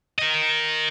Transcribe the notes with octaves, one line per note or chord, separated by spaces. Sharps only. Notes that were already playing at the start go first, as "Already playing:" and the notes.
A#4 D#5